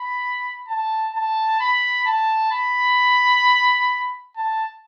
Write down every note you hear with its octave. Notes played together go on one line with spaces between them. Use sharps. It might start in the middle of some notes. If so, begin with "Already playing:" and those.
Already playing: B5
A5
A5
B5
A5
B5
A5